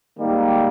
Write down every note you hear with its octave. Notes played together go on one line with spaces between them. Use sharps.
G#2 D#3 G3 A#3